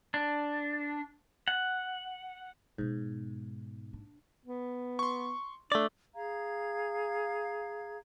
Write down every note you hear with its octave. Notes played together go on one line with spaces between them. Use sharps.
D4
F#5
G#2 B2 B3
D4
B3
C6 C#6
A3 D4 D5
G#4 F5 A#5 G#6